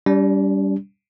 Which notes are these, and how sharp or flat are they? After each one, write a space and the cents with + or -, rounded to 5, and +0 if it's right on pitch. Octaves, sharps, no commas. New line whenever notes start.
G3 +0 D4 -45